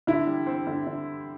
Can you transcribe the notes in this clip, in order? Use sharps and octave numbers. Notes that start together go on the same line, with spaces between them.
D3 E4
G3
C4
D3
D3